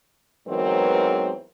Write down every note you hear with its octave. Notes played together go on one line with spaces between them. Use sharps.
E2 G#2 E3 F#3 C4 A#4